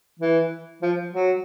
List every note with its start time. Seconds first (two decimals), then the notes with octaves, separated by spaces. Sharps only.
0.20 E3
0.82 F3
1.13 F#3